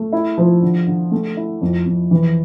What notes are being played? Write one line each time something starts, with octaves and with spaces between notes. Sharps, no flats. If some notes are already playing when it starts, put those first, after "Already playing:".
Already playing: A3
E4
F3
D3
D3
A3
E4
F2
F2
E3